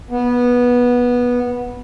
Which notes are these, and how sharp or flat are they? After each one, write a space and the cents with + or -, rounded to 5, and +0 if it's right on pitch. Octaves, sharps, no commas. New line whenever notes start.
B3 -15